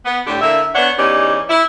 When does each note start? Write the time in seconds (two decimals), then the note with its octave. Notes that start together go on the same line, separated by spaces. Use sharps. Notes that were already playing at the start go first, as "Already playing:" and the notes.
0.05 B3
0.26 A2 D3 D4 G4
0.41 D3 A#3 E4 E5
0.75 B3 D4 C#5 D5 F#5
0.98 E2 E3 C#4 D#4 G4 D5
1.49 E4